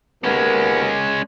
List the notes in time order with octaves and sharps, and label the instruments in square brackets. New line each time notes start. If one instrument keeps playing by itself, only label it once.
[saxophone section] D#2 B3 A#4 [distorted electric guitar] G#3 C#4